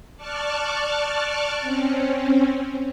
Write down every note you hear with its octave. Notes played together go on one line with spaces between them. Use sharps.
D5 A5 C#6 D6 F6 F#6
C4 C#4